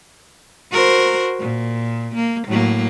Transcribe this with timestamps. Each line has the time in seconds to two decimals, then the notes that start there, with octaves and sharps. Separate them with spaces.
0.71 F#4 A#4 C5
1.40 A#2
2.15 A#3
2.47 A2 F#3 A#3